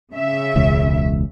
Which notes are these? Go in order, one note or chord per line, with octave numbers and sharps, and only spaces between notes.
C#3 E5
E1 C#2